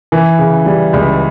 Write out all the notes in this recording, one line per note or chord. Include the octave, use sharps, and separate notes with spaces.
E3
C#3
G3
C#2